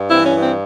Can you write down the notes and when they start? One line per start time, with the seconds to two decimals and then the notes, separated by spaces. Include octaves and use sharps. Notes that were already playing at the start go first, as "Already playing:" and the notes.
Already playing: G2
0.09 E3 C4 E4
0.24 C#4
0.34 G2
0.40 C4